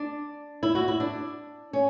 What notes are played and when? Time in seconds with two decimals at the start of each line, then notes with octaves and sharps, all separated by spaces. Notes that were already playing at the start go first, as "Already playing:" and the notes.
Already playing: D4
0.63 E4
0.75 F#4
0.88 E4
1.00 D4
1.73 C#4